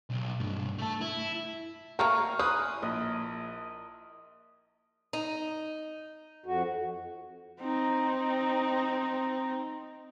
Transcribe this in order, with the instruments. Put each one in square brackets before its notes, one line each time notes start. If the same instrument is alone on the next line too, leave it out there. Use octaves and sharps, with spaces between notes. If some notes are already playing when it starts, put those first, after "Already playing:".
[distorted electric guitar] B1
C2 G2
A3 A5
E4
[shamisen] A3 A#3 G4 [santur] A#4 [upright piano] A#5 C#6
[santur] E4 G#5 C6 [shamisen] B4 [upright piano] D#6 F#6
[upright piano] A#1 [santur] D#5
[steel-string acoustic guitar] D#4
[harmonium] F2 F#4
[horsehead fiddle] C4 D#4